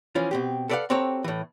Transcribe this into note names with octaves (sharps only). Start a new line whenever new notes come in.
E3 F3 C#4 F4
B2 C4 G4
A4 B4 D5 D#5 F5 F#5
C4 F#4 G4 A4 C#5 A#5
A2 E3